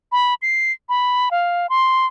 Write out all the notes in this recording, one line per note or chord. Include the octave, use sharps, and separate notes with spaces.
B5
C7
B5
F5
C6